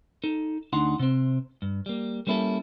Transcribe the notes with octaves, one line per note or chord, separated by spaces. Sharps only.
D#4 A4
D2 D4 D#4 F#5 C6
C3 C4
G2
G3 A#3
G3 A#3 C#4 E4 G#4 A4